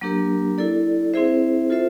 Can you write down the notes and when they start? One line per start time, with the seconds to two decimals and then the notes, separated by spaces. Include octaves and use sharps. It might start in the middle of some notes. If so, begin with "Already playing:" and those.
0.01 F#3 A#3 D4 G4 A#4
0.58 E4 A4 D5
1.13 C4 E4 G#4 C5 E5
1.70 F4 A4 C5 E5